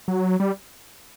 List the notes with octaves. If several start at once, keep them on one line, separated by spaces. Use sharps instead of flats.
F#3
G3